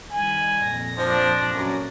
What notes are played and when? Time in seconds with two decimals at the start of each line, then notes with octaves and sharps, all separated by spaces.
0.11 D#3 G3 G#5 B5
0.64 F2 A#2 A#6
0.98 F3 D4
1.52 F#2